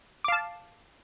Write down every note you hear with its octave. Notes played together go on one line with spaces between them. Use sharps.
F5 A5 D6